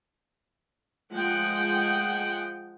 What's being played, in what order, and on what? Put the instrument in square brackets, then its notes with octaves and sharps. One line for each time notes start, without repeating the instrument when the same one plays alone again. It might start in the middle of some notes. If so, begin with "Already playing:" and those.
[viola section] F3 G#3 G#4 F#5 G5